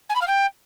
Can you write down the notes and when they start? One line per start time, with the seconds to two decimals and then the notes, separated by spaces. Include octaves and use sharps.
0.09 G#5
0.15 B5
0.21 F5
0.27 G5